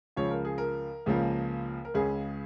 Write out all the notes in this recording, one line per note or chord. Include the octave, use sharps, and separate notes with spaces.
C#2 C#3 F3 C#5
A#4
G#4
A#4
C#2 C#3 F3 A#3
A#4
C#2 C#3 G#3 G#4